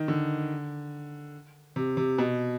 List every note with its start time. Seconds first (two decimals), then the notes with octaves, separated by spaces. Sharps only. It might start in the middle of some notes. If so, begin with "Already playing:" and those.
Already playing: D#3
0.08 D3
1.76 C3
1.97 C3
2.18 B2